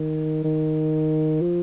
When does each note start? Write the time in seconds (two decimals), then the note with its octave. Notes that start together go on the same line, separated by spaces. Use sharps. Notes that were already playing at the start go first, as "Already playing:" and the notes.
Already playing: D#3
0.44 D#3
1.41 F3